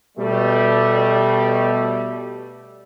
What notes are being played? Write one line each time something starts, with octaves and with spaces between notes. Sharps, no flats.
B2 G3 A3